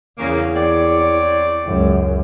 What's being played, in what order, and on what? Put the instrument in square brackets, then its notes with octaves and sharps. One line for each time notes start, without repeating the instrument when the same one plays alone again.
[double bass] E2 [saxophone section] C#3 A#3
[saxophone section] C4 C#5 D5
[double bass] C#2 F#2